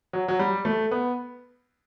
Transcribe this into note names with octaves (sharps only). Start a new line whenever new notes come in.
F#3
F#3
G3
A3
B3